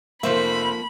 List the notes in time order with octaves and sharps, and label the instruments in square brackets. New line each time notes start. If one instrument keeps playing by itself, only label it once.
[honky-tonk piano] F1 C5 E5 [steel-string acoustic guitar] F3 A#3 [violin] B5